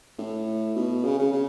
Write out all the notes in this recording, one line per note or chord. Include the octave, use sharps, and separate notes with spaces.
A2
B2
C#3
C#3
C#3